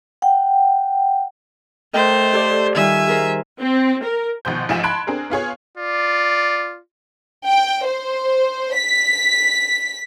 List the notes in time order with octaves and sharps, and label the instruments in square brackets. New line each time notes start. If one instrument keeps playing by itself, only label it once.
[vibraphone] F#5 G5
[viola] A3 C5 [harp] A#4 D#5 G5
[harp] G4 A4 D5
[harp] D#3 G3 F4 [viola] E5 G#5
[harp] G#4 A#4 C5
[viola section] C4
A#4
[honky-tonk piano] G#1 B2 F3 C5 G6
A1 G#2 F3 E5 G#5 E7
A5 B5 C6 F#6 G#6 D7
C4 D4 G#4 A#4
B3 F4 G#4 C#5
[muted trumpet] F4 [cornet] D5
[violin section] G5
C5
B6